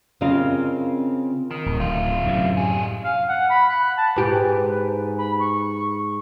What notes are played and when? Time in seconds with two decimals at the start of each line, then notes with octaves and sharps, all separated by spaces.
0.21 C#3 C4 F4 A#4 D#5 F5
1.51 D#3
1.66 D1
1.80 A3 F4
2.26 F#2 A2 C3
2.57 G3 G#4
3.04 F5
3.28 F#5
3.50 B5
3.69 F#6
3.98 A5
4.16 G#2 G4 B4
5.18 B5
5.40 C#6